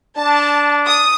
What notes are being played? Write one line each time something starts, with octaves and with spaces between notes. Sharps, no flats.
D4 A5
D#6